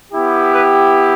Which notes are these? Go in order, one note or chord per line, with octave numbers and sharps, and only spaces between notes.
B3 E4 G4
B4